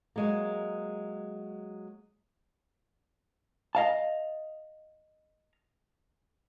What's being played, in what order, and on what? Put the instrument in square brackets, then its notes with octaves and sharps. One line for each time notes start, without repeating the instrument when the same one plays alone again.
[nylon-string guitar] F#3 G#3 A#3
[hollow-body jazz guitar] D#5 F5 A5